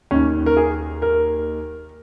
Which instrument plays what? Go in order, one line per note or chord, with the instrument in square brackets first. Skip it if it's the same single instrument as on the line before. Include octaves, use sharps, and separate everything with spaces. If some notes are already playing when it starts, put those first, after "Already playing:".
[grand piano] D#2 D#3 C#4
A#4
G#4
A#4